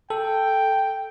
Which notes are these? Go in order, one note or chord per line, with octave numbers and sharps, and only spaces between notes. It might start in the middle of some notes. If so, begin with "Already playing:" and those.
A4 G5